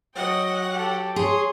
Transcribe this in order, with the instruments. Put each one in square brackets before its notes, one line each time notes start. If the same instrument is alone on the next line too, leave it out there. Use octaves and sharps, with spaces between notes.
[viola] F#3 F#5 [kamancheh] D#5 G5
[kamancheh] G4 A4
[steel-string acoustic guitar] G#4 [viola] C#5 [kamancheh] C6